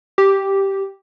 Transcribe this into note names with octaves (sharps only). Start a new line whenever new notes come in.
G4